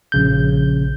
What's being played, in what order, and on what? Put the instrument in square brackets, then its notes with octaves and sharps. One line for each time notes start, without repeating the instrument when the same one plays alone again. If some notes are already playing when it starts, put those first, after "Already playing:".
[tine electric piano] A#1 C#3 G6